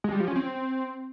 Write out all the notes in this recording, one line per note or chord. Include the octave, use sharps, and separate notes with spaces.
G#3
G3
F3
C#4
C4